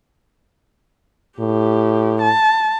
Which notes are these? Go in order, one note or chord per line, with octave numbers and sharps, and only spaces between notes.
A2 G4
A5